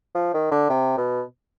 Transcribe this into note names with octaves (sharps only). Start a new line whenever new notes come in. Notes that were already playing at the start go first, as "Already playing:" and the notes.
F3
D#3
D3
C3
B2